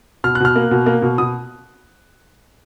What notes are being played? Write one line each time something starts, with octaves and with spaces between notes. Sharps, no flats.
B2 F6
F#6
B2 F6
A#3
B2
A#3
B2
B2 D#6